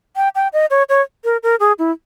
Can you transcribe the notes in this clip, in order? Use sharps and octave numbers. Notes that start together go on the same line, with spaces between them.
G5
G5
D#5
C#5
C#5
A#4
A#4
G#4
E4